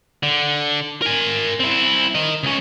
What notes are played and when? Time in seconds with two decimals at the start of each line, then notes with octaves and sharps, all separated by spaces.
0.23 D3
1.02 A#4 G#5
1.60 C4 E4
2.15 A#4 D#5
2.43 C#2 C#4